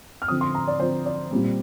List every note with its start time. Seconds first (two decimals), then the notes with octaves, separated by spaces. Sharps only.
0.22 F6
0.28 D3 F3 C4 D#6
0.41 C6
0.55 A#5
0.68 D5
0.80 D3 F3 C4 C5
1.06 D5
1.31 A#2 G3 C4